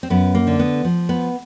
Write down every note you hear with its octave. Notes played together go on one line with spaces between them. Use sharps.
C4
F#2 B3
A#3
D3
B3
F3
B3